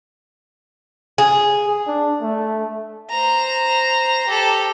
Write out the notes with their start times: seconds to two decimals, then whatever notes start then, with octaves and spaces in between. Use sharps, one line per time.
1.18 G#4
1.87 D4
2.22 A3
3.10 C5 A#5
4.27 G4 A4